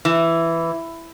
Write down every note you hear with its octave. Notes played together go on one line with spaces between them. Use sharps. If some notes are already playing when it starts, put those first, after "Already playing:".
E3